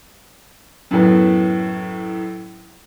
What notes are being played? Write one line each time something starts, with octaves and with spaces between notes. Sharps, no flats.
F#2 A2 B3